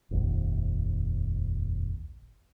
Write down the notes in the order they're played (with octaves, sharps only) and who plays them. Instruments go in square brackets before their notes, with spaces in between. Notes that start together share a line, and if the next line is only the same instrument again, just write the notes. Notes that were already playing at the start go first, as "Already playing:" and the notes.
[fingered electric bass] F1 A#1 D#2